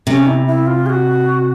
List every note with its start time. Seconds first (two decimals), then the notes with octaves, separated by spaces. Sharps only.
0.07 C3 C#4
0.27 E4
0.47 E4
0.67 F4
0.86 G#4
0.90 F#4